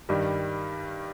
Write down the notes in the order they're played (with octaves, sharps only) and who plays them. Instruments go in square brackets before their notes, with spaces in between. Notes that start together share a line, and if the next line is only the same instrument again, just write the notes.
[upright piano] G2 D#3 G3